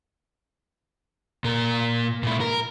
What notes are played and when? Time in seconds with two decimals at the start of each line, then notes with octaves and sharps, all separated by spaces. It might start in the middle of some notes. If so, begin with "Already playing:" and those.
1.44 A#2 A#4
2.23 A#2 E4
2.41 A#4